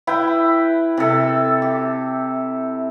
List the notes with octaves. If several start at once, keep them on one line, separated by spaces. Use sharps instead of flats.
E4 B4 G5
C3 A4
G4